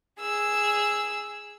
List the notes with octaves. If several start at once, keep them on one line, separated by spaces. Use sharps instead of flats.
G#4 E6